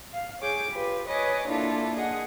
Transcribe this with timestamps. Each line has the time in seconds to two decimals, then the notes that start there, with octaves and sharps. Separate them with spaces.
0.13 F5
0.41 G#4 C#5 D6 G6
0.70 F4 G4 B4
1.07 B4 C#5 D#5 G#5 D6
1.47 A#3 D4 E4 F4 A4
1.96 G#4 D#5 F#5